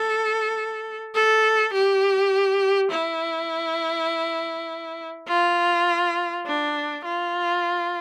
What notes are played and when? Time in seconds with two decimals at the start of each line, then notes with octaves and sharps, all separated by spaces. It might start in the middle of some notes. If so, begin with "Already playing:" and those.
Already playing: A4
1.15 A4
1.74 G4
2.92 E4
5.28 F4
6.46 D4
7.05 F4